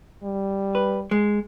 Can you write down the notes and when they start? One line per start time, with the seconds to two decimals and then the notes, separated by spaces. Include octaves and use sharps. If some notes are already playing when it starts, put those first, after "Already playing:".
0.23 G3
0.75 B4
1.11 G#3